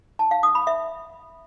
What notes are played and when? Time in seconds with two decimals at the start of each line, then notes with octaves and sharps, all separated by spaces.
0.19 A5
0.31 F5
0.43 D#6
0.55 B5
0.67 E5